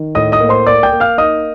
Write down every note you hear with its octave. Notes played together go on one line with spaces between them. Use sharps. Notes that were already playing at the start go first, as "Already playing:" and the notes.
Already playing: D#3
A2 D#5 D#6
D#5 D#6
A#3
C5 C6
A#3 D5 D6
G5 G6
A#3
F5 F6
D#4 D#5 D#6